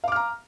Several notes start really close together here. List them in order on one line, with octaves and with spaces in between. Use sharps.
F5 D6 F6 A#5